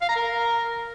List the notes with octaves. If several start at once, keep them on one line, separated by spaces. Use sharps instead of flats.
F5
A#5
A#4